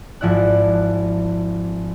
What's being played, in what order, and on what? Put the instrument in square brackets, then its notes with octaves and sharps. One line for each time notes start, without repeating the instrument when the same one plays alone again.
[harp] G#1 F3 E4 D5 F#6